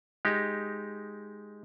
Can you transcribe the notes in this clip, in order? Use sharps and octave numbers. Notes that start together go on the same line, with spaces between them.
G#3 D#4 G4